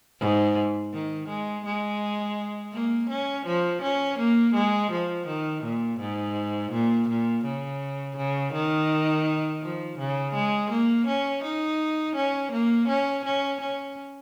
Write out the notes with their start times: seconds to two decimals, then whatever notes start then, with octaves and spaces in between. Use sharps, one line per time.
0.20 G#2
0.93 D#3
1.28 G#3
1.65 G#3
2.73 A#3
3.10 C#4
3.46 F3
3.82 C#4
4.19 A#3
4.55 G#3
4.92 F3
5.27 D#3
5.63 A#2
6.00 G#2
6.72 A#2
7.08 A#2
7.45 C#3
8.17 C#3
8.53 D#3
9.62 F3
9.98 C#3
10.34 G#3
10.71 A#3
11.07 C#4
11.43 D#4
12.16 C#4
12.52 A#3
12.88 C#4
13.24 C#4
13.61 C#4